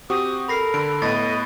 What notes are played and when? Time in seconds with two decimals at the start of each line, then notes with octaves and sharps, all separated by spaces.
0.10 C4 F#4 G4 D#6
0.48 A4 A#4 B5 A#6 C7
0.74 D3 B5 D7
1.02 A2 B3 D#5 A6 A#6